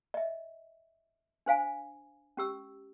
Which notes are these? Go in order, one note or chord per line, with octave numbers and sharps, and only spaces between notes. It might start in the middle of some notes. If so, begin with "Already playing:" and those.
D#5 E5
D4 C5 F5 G#5
C#4 G4 E6